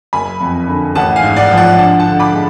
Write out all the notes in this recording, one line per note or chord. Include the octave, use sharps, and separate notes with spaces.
F#1 G#5 B5
F2
D3
A1 F#5 A5
F5 G#5
G#2
D5 F#5
F3
D5 F#5
D4 F#5 A5
F#5 A5
D3
B5 D6
G#3